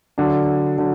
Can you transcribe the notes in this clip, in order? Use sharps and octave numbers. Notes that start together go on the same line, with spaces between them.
D3 F#3 D4
D3 F#3